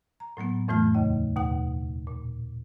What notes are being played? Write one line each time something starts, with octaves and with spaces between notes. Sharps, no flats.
A#5
A2 F#3 A#3 B3
F2 A2 E3 A3 F4 F6
D#2 C#3 D#5
D#2 B2 F#5
A#2